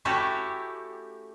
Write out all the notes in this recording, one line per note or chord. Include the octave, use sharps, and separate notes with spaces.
A3 C#4 E4 F#4 G4 A4